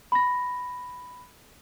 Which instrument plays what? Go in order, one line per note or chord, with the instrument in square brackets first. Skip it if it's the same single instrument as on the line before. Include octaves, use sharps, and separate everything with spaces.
[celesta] B5 A#6